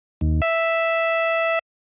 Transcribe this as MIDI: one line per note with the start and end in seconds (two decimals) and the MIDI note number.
0.21 0.41 39
0.42 1.59 76